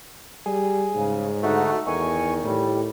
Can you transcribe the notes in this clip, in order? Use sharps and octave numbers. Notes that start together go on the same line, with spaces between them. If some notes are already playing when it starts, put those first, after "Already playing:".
G3 G#4
G#2 C#3
D3 A3 D#4 F#4
E2 D#3 G#5 C#6
A2 G3